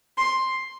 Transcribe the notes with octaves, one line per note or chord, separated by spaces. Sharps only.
C6